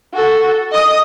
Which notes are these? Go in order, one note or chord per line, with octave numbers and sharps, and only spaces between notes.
F#4 A4
D#5 D#6